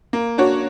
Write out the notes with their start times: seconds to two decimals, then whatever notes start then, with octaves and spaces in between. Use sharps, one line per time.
0.13 A#3
0.38 D4 F#4 C#5